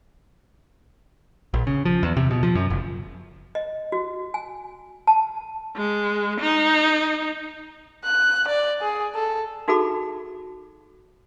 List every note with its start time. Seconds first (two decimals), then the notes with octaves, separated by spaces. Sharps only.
1.54 A#1
1.67 C#3
1.85 F3
2.03 E2
2.17 C3
2.31 B2
2.43 F3
2.55 F#2
2.70 F#1
3.55 D#5
3.92 F#4
4.34 G#5
5.07 A5
5.76 G#3
6.41 D#4
8.04 F#6
8.48 D5
8.82 G#4
9.15 A4
9.68 D#4 F#4 G#4 A4 B5 D6